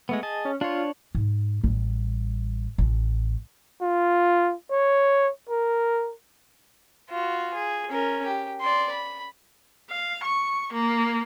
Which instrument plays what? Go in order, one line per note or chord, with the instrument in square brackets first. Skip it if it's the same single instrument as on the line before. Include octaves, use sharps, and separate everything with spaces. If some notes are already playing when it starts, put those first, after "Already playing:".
[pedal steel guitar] G#3 A3 B3
G#4 D#5 A5
[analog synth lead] C#4
[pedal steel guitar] D4 C#5 [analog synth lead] F4
[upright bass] G#2
A1 G3
A1
[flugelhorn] F4
C#5
A#4
[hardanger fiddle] F4 F#4
G#4
C#4 A#4
G4
D5 C6
B5
[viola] F5
C#6
A#3